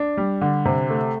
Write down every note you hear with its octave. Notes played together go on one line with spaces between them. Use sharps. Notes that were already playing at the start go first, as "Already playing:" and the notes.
Already playing: D4
G3
D3
C3
A3